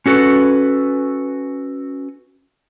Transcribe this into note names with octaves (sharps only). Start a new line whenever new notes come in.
C#4 F#4 A4 B4